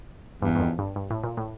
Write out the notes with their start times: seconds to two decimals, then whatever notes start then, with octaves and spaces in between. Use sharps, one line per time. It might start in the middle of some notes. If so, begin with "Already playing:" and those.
0.42 E2 G2
0.56 G2
0.60 F2
0.79 G2
0.96 G2
1.10 A2
1.23 A#2
1.37 A2